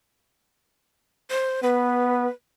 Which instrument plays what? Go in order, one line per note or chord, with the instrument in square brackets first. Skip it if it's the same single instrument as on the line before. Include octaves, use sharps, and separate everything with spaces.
[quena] C5
[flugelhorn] B3 [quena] B4